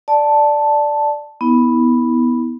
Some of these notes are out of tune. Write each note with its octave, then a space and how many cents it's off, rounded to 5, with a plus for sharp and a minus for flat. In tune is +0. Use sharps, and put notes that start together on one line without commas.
D5 +0 A5 +0
B3 +0 E4 -35